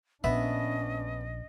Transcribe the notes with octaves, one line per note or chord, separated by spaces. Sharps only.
A#1 B3 C#4 D4 D#5 E5